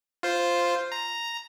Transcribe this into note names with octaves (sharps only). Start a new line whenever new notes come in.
F4 C5
A#5